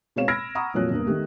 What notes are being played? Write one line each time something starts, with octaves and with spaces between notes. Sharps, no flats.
B2 G#3 C4 C#5 F5 E7
B5 E6 F6 G#6 A#6 D7
F#5 A#5 B5 C#6 D#6
F1 A#2 F3 F#3 C#5 F#6
E1 G2 A#3
D#3 A3 G4